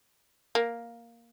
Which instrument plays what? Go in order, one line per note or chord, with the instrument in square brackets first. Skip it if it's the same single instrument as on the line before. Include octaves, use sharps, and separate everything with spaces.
[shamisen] A#3